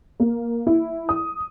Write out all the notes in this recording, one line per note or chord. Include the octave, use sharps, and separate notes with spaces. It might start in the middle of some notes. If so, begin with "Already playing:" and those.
A#3
E4
D#6